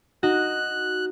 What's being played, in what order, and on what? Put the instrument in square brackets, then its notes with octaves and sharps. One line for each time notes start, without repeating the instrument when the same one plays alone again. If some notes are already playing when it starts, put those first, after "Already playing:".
[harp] D#4 [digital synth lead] F#4 [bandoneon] F#6